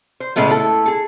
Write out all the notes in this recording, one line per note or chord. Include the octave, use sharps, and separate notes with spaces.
C5
A#2 C#3 G#3 A3 B3
A3 E4 A4
G#4 A4